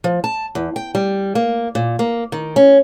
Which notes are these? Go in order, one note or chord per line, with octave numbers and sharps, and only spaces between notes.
F3
A5
E2
G5
G3
A#3
A#2
A#3
D#3
C#4